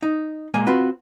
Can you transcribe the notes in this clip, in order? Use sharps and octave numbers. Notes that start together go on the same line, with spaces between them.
D#4
A#2 G#3 A#3 G#5
C4 F4 F#4 B4